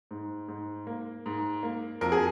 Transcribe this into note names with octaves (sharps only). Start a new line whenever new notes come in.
G#2
G#2
A#3
G#2
A#3
F2 A#4
G#4